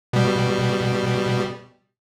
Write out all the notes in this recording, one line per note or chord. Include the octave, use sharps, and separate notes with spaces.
B2 G3